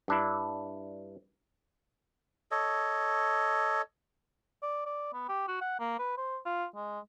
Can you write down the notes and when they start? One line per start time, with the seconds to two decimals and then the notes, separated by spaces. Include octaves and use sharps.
0.08 G2 D4 E4
2.51 A4 C#5 D#5
4.62 D5
4.86 D5
5.14 B3
5.29 G4
5.48 F#4
5.61 F#5
5.79 A#3
5.99 B4
6.17 C5
6.46 F4
6.75 G#3